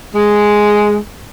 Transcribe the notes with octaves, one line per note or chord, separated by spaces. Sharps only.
G#3